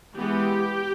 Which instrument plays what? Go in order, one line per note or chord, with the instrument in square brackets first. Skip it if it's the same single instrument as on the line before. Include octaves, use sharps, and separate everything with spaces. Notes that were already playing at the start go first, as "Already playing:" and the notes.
[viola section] E3 G#3 B3 G4